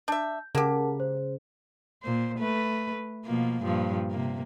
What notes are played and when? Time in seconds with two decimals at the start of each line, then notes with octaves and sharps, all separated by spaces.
0.08 D4 E5 G6
0.55 C#3 A#3 G4 A#4 F#5 A5
1.00 C5
2.03 A#2 C5
2.38 A3 B4
3.25 B2 F3 A#3
3.63 G2 A#2 F3
4.10 C3 A#3